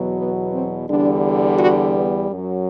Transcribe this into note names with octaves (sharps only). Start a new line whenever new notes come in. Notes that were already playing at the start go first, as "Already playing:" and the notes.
Already playing: E2 B2 F#3
B3
C4
E2 D3 G3 D4
F#4
B3
F#2 F#3